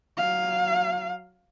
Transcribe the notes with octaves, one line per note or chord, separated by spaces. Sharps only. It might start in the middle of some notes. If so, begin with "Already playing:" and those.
F#3 F5